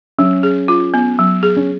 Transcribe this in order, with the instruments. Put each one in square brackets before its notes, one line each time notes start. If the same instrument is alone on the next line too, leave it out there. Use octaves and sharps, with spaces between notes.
[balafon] F#3 [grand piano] C#4
[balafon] G#4
F4
B3
F#3
G#4
[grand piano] C#4